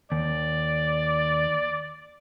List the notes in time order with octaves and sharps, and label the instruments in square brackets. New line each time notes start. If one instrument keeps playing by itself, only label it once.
[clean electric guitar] D#2 [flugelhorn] D5